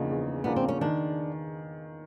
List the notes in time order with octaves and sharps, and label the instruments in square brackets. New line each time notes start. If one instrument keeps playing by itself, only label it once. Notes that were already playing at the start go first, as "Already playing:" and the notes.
Already playing: [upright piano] E2 C#3 F3 A#3 D4 [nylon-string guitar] D#4
[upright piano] E2
[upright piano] C#3 F3 A#3 D4 [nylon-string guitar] B3
[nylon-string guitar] C4
C#4
[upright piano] D#3 [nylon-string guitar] D4